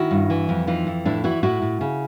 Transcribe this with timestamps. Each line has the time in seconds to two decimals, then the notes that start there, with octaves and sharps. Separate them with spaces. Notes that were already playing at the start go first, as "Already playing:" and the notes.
Already playing: D#3 E4 F#4
0.11 G2
0.30 E3
0.49 F2
0.67 E3 D#4 F4
0.87 F2
1.05 A2 D4 E4
1.24 E3 E4 F#4
1.43 A2 E4 F#4
1.62 A2
1.81 C#3